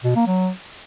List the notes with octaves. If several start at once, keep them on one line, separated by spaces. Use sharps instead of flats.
B2
A#3
F#3